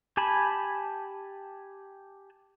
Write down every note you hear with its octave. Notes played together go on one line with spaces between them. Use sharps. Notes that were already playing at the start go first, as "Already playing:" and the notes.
G4 G#5 A5 B5